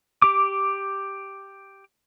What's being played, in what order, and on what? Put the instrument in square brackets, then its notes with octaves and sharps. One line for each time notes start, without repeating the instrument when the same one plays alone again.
[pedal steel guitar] G4 D6